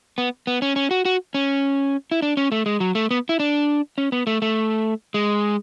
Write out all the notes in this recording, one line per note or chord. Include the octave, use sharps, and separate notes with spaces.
B3
B3
C#4
C#4
F#4
F#4
C#4
E4
D4
C#4
A3
G#3
F#3
A3
B3
E4
D4
C#4
B3
A3
A3
G#3